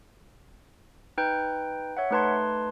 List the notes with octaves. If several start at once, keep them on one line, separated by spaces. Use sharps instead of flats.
D#4 B4 G5 G6
C#5 E5 F#5
A3 D#4 B4 A5 C6 G#6